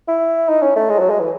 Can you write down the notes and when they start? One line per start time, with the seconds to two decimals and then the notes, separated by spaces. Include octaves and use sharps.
0.08 E4
0.49 D#4
0.62 C#4
0.76 A3
0.90 G#3
0.99 F#3
1.10 G#3
1.20 E3